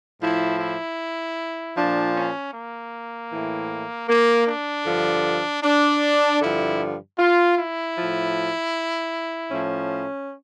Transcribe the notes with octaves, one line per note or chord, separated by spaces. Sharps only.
A2 F3 E4
E4
A#2 F3 D4
C#4
A#3
A2 E3
A#3
D4
G2 D3 F3
D4
G2 D3 F3 E4
F4
E4
A2 F3
A2 F3 C#4